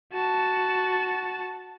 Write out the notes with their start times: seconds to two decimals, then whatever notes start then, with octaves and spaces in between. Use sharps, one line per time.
0.12 F#4 A5